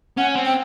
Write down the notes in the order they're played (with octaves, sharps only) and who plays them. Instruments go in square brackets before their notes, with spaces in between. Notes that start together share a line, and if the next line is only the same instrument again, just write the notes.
[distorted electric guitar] C#4 [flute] F#5
[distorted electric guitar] C4
[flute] G5